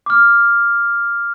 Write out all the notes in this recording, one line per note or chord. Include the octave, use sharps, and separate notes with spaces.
D6 F6